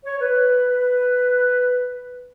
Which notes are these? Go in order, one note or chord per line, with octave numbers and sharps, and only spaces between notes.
C#5
B4